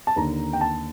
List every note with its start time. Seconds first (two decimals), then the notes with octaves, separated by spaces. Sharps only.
0.07 A5
0.16 D#2 D3 A#5
0.53 G5
0.61 A5